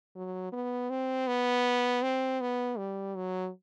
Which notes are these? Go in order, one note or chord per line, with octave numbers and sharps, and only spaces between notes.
F#3
B3
C4
B3
C4
B3
G3
F#3